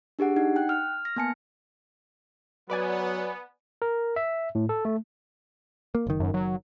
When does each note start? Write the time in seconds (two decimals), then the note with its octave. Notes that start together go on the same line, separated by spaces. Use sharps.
0.19 D4 G4 G#4 F#5
0.36 D#4 F#5
0.56 G5 F#6
0.69 F6
1.05 F6 A#6
1.16 A#3 B3 G#5 A5 C#7
2.70 F#3 B3 B4 D5 G#5
3.82 A#4
4.16 E5
4.55 A2
4.69 A4
4.85 A3
5.95 A#3
6.07 F#1 D#3
6.20 F#2
6.34 F#3